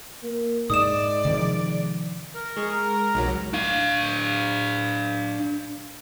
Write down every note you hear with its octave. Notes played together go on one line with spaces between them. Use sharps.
A#3
G#2 G#3 D5 D#6 E7
C3 D#3 F3
A#4
G#3 G#4 C#6
A#5
B1 F#3
D4 F5